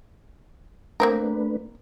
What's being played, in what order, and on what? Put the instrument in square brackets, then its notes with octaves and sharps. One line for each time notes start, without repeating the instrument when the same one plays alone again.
[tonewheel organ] A3 D4 B4 [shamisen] A#3 C4 A#4